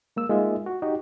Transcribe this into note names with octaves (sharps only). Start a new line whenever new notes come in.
G#3 A#3 E6
G#3 A#3 D#4 F4 D#5 E5
F#4
D#4 F#4 G4 D#5